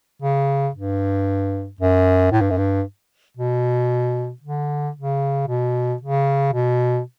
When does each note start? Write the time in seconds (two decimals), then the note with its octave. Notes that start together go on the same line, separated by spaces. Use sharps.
0.22 C#3
0.75 G2
1.80 F#2
2.32 A2
2.41 G2
2.50 F#2
2.58 G2
3.37 B2
4.42 D3
4.96 C#3
5.48 B2
6.01 C#3
6.53 B2